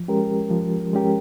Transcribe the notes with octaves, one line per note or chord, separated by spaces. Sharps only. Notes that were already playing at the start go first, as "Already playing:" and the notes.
Already playing: F3
G#3 C#4 G4 A#4
F3
G#3 C#4 G4 A#4